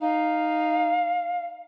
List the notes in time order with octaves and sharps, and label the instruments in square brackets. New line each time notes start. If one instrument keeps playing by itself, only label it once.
[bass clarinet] D#4 [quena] F5